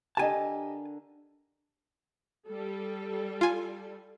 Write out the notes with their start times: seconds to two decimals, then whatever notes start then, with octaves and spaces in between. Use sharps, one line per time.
0.17 D3 G4 A#4 D#5 G#5 A5
2.48 G3 A4
3.41 F4 G#5